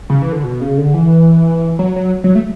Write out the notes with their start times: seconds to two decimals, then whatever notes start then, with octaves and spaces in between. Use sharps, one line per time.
0.10 C#3
0.22 E3
0.32 D3
0.43 B2
0.61 C#3
0.78 D3
0.94 E3
1.79 F#3
1.96 F#3
2.24 F#3
2.35 A3